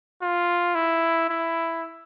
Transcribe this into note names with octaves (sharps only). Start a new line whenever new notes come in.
F4
E4
E4